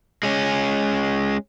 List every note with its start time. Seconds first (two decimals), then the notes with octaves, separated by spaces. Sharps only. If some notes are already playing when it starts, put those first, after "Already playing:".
0.23 G#3 C#4